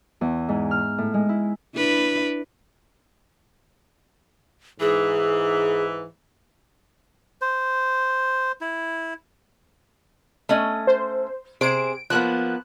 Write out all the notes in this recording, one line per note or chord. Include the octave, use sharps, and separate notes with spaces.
E2
G#2
F6
A2
G#3
E4
D4 E4 B4
G#2 E3 G#4
C5
E4
A3 C#4 D#5
C5
C3 G#4 C5 D7
F3 A#3 B3 F#6